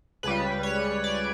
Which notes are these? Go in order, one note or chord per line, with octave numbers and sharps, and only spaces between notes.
C#2 C#3 G3 B4
C#5
D5